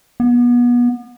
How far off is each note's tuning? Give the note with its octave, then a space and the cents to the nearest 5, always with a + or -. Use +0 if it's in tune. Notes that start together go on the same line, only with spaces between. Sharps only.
B3 -30